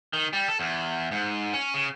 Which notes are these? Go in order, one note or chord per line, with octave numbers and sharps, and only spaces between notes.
D#3
G3
A4
E2
G#2
C#4
C#3